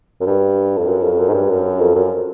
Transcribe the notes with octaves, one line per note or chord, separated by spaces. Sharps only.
F#2
G2
F2
F#2
F2
F#2
G#2
G2
F#2
F2
F#2